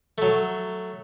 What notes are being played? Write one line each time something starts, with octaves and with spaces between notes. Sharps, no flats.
F#3 A3